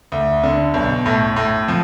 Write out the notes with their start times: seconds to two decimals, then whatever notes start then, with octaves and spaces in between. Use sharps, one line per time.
0.12 D2
0.43 D3
0.74 B1
1.06 A2
1.36 A2
1.68 F3